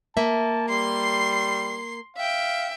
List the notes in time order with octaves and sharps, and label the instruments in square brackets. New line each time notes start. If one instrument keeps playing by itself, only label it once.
[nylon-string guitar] A#3 E5 [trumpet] A5
[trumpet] G3 [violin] C6 C7
[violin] E5 G5 [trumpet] F5